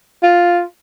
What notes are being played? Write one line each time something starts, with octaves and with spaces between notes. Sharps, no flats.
F4